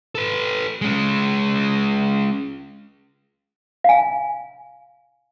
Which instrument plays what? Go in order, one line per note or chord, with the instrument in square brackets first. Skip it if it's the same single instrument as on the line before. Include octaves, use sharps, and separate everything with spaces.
[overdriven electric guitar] A4 B4
G#3 C#4
[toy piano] F5 G#5